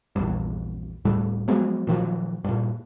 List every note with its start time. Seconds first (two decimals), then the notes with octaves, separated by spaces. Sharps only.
0.16 A#1 E2 G2
1.05 D1 A2 G3 A3
1.48 F3 F#3 G#3 B3
1.87 A#2 D#3 F3 F#3
2.44 G2 A#2